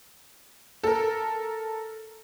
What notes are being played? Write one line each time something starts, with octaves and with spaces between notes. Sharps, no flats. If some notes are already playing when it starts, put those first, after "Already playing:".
A4 A#4